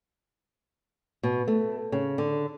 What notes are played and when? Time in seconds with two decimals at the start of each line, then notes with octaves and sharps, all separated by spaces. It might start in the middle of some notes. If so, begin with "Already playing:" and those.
1.23 B2
1.48 A3
1.92 C#3
2.18 D3